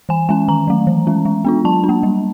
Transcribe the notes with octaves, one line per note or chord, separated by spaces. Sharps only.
E3 G#5
G#3 C#4 G#5
D#3 A#5
F#3 A3
E3
G#3 C#4
G#3
B3 D4 F4
F#3 A5
D4
A#3
G3